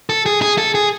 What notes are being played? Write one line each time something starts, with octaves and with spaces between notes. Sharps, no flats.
A4
G#4
G#4
A4
G#4